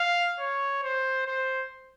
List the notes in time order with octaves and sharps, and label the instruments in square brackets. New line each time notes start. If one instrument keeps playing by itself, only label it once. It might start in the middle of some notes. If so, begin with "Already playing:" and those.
Already playing: [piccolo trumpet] F5
C#5
C5
C5